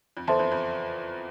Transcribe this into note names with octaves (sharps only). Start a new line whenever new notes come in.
F2
E2 A4 C5 E5 A5 C6
F2
F2